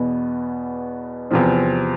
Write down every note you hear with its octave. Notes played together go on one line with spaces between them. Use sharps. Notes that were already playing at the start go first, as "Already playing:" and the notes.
Already playing: E2 B2 B3
E2 C3 F3 C4